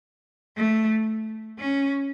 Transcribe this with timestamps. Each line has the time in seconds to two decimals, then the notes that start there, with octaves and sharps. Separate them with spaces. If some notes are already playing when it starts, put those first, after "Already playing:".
0.57 A3
1.58 C#4